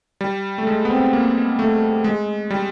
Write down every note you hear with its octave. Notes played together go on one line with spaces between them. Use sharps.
G3
A3
G#3
B3
C4
A#3
A3
G#3
G3